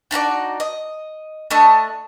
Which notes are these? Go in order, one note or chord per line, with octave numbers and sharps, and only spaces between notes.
D4 D#4 F#4 D5
D#5
A3 D4 D#5 C#6